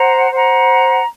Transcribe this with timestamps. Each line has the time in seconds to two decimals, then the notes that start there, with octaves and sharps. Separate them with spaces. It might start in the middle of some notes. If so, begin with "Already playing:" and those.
Already playing: C5 F#5 A#5
0.30 C5 F#5 A#5